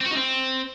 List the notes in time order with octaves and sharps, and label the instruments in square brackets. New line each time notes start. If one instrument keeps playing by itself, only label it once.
[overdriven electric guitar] C4
F#4
D#4
C4